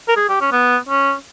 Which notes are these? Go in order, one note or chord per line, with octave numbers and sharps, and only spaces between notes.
A#4
G#4
G4
C#4
B3
C#4